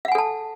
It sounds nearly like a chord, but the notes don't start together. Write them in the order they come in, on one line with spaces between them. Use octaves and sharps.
F5 F#5 G#5 A4 A5